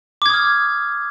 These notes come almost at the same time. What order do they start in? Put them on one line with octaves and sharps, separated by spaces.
D6 G#6 D#6 F6